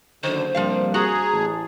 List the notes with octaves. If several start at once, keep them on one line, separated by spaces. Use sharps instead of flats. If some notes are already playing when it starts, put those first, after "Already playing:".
F#1 D3 D#3 C5
G2 C3 F3 G3 A#3 F5
F#4 G#4 A#5
A1 A5